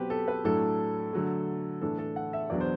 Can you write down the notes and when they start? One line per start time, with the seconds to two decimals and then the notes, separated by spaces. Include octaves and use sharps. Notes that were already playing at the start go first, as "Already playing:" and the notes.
Already playing: B2 F#3 C4 G4 B4
0.10 A4
0.28 B4
0.45 A2 F#3 A3 D4 A4
1.13 D3 F#3 A3
1.81 A2 E3 A3 D4 A4
1.98 A4
2.16 F#5
2.33 E5
2.50 E2 B2 F#3 B3 D4 D5
2.61 C5